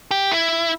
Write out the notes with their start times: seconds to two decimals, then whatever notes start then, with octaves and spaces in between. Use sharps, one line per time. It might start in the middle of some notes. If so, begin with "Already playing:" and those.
0.11 G4
0.32 E4